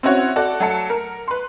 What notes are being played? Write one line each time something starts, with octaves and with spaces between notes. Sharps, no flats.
C4 C#4 E4 F#4 C#5
F#4 A4 D5
F#3 A3 A5 C#7
A#4
B4 C6